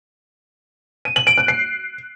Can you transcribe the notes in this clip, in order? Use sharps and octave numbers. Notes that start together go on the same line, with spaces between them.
D#7
F#7
D7
F#6
C7